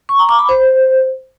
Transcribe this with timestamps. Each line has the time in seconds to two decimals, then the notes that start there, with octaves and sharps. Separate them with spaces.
0.09 C#6
0.19 A#5
0.29 D6
0.39 B5
0.49 C5